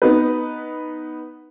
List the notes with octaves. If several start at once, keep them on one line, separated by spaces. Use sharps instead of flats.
B3 D#4 B4